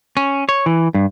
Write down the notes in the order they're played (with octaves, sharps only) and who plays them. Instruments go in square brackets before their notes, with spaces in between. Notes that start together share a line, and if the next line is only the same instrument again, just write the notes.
[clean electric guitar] C#4
C#5
E3
G2